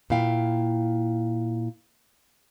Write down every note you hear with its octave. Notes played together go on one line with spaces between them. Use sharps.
A#2 E4 F5 G5